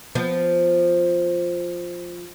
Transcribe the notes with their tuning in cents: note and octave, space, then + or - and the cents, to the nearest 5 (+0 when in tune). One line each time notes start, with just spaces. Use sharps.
F3 +0 B3 +20